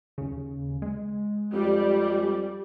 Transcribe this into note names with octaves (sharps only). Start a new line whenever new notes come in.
D#2 C#3
G#3
F2 G3